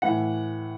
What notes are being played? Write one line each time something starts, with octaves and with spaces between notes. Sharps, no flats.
A2 E3 F#5